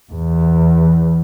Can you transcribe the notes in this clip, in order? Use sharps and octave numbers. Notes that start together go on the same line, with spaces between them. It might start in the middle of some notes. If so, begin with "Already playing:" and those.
E2